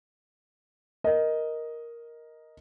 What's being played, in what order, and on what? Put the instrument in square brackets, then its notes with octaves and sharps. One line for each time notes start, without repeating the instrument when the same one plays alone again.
[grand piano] A#4 D#5